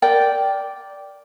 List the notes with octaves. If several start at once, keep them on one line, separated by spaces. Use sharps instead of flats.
A#4 D5 G5